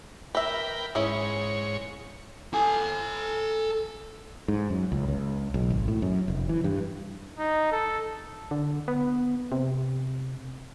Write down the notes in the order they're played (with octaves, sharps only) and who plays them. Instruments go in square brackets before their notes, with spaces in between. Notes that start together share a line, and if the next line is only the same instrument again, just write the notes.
[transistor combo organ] A#4 G5 B5 [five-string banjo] B4 E5
[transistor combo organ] G#2 C#5 [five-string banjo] C#4 E4 G#4
[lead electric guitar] A4 G#5
[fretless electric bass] G#2
F#2
C#2
C#2
B1
G#1
A2
F#2
F1
E3
G2
[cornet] D#4
A4
[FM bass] D3
B3
C3